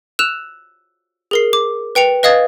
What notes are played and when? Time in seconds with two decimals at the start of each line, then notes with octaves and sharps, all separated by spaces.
0.19 E6 F#6 E7 F7
1.31 G#4 A#4 C7
1.53 D6
1.95 B4 G5 C#7 F7
2.23 B4 D#5 F5 D#6 G#6 A6